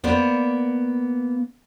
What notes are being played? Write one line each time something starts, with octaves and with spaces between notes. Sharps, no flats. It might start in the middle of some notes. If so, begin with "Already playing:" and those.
A#3 B3 C5 D5